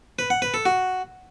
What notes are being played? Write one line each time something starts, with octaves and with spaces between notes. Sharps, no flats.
B4
F#5
B4
A4
F#4